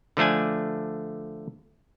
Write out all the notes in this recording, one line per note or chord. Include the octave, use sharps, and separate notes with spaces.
D3 F3 A3 D4 G#5